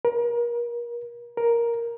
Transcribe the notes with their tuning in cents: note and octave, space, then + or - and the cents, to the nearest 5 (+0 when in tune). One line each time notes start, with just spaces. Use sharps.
A#4 +30
A#4 +5